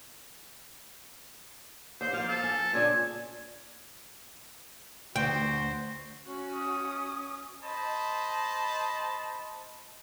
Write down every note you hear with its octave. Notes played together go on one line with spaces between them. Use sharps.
D#2 C5
F3 A#3 F5
A4
G#5
A#2 C#3 D4 G#5
D2 F#4 C5 G5
C#4 F#4
D#6
C5 D#5 A5 B5